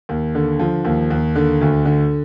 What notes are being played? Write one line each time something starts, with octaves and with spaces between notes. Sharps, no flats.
D#2
D3
F3
D#2
D#2
D3
D2
D3